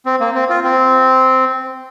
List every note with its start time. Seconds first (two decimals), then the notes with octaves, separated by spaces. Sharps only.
0.06 C4
0.20 A#3
0.34 C4
0.50 F4
0.64 C4